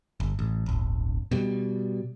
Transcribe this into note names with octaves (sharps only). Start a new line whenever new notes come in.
G1
A1
D1 G1
B2 G3